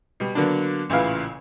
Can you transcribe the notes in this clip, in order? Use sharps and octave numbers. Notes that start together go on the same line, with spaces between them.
B2 G3
D3 F#3 A#3 B3 D4
A1 A#2 C#3 E4 B4 F5